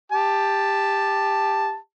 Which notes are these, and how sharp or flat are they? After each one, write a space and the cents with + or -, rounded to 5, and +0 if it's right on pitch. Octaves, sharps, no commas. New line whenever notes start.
G4 +15 A5 +0